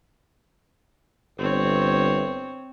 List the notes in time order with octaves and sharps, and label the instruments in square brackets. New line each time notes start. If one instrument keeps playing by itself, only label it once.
[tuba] G1 [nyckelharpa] C4 C#5